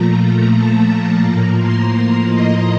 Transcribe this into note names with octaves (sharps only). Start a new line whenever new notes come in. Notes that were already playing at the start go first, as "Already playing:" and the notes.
Already playing: A#2 F3 A3 A#5
A#5
A5
A#5
A2 F3 A#3 A#5
C6
A#5
D#5